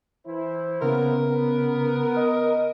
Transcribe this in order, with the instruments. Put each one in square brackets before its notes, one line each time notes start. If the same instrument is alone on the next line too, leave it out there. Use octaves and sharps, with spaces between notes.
[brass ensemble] E3 E4 C5
[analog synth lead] C#3 [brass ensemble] A#3 B3 [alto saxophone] A#4
[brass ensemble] B3
[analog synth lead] D#5